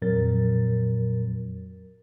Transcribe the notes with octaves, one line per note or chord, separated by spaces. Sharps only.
F2 A#2 F#3 A#4 A6